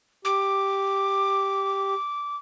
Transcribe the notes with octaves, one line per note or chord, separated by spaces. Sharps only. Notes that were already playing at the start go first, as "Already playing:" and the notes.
G4 D6